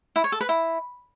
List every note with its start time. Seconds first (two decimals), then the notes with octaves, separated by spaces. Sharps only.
0.16 E4
0.24 C#5
0.32 A4
0.41 B4
0.49 E4